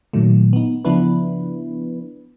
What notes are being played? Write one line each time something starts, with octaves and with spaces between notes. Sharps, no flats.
A#2 D#3 F#3 A3
B3 D#4
C#3 F3 B3 D4 E4 B4